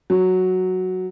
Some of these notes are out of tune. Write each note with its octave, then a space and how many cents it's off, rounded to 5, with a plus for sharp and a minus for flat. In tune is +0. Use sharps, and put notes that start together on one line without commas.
F#3 +0